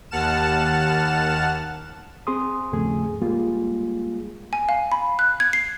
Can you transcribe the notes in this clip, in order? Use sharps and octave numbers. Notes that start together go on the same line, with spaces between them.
D#2 F#5 A5 F6 E7
C4 G#4 C6 D#6
D#2 G#2 C#3 F3 A3 G#4
G3 G#3 A#3 F4 G#4
G#5
F5
B5
F#6
G#6
C7